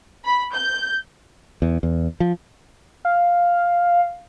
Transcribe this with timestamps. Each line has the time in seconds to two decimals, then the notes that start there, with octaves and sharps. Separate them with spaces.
0.25 B5
0.54 G6
1.62 E2
1.83 E2
2.20 F3
3.05 F5